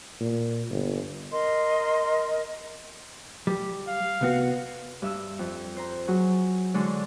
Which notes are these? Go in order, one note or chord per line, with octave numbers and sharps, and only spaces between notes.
A#2
G1
A#4 D#5 C6
G3
F5
C2 B3 F#4
G2 E5 E6
F2
C5 A#5
F#3 F#4 G#4
D3 E3 G#3 C#5 D5